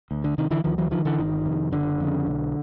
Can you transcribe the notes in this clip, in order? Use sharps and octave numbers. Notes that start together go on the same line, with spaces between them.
D2
D3
C3 D#3
D3 E3
D2 D#3 F3
E3 F#3
D3 D#3 F3
D3 E3
G1 D#3
F2 C3
F#1 D3
F2 C#3
B1